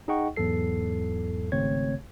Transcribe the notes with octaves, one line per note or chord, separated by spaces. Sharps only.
D#4 G#4 D#5 F#5 G5 C#6
E2 G#2 F#3 A4 C7
G#1 C#3 A3 C4 C#5 G#6